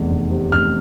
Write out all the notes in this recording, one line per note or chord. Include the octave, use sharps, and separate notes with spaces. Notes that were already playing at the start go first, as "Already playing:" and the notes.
Already playing: F1 E2
F1
C3
F1 F6